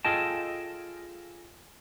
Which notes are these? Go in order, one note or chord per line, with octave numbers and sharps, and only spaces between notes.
F4 G#4 A4 D#5 G5 A5